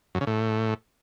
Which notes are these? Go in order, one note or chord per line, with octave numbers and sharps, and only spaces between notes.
F#2
C#3
A2